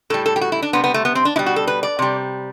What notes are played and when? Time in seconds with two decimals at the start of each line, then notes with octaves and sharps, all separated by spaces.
0.10 A2 G3 A4
0.26 A4
0.36 G4
0.41 F#4
0.52 E4
0.62 D4
0.73 C3 G3 B3
0.84 B3
0.94 A3
1.05 B3
1.15 C4
1.25 D4
1.36 B2 G3 E4
1.46 F#4
1.56 A4
1.67 B4
1.83 D5
1.99 C3 G3